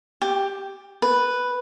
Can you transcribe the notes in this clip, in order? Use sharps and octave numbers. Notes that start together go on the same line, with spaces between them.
G4
B4